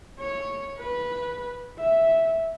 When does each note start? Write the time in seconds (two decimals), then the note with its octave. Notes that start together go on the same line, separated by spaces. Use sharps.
0.20 C#5
0.78 B4
1.79 E5